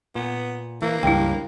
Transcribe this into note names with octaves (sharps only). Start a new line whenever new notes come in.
A#2 B3
E3 A#3
C#2 G2 E4 G5